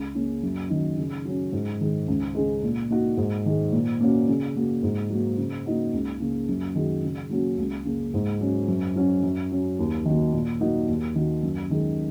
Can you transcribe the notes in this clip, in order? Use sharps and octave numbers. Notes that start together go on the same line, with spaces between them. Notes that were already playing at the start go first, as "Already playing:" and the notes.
Already playing: C#2
C#3 A#3 C#4
F#2
D#3 F#3 D#4
C#3
F#3 C#4
G#2
D#3 G#3 D#4
C#2
C#3 G#3
A#2
A#3 D#4 F#4
G#2
D#3 G#3
A#2
A#3 C#4 F#4
C#3
A#3 F#4
G#2
F#3 A#3
C#3
A#3 D#4 F#4
C#2
C#3 A#3
F#2
D#3 G#3 F#4
C#3
F#3 A#3 C#4 F#4
C#2
C#3 A#3
G#2
F#3 C#4
F#2
F#3 C#4 F#4
F#2
F#3 C#4
D#2
D#3 F#3 A#3
A#2
F#3 A#3 D#4 F#4
D#2
D#3 A#3 F#4
F#2
D#3 G#3